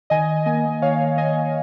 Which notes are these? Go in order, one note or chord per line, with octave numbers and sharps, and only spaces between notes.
D#3 D#5 G#5
A#3 D#5 G#5
D#3 C#5 F5
A#3 D#5 G#5